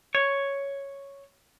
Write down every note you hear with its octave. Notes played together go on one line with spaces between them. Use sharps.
C#5